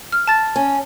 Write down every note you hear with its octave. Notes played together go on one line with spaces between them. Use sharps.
F6
A5 A6
C#4